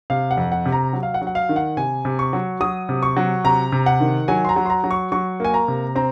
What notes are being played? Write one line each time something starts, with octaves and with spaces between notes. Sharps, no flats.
C3 F5
F#5
F2
F#5
C3
A#5
F#3
F5
F#5
F#3
F#5
F5
D#3
F#5
C3 G#5
C3
C#6
F#3
F#3 D#6
C3
C#6
F#3
C3 A#5
C3
F#5
D#3
F#3 G#5
C6
A#5
F#3
C6
A#5
F#3
C#6
F#3 C#6
A#3 G#5
A#5
C3
C4 A#5